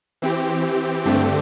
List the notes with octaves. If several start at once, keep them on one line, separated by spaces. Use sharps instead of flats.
E3 C4 G4
G2 D3 A3 C4 G4